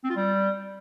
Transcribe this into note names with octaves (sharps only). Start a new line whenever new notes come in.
C4
F4
G3